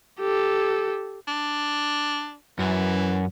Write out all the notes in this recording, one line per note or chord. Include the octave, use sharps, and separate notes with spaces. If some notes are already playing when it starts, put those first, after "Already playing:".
G4 A4
D4
F#2 E3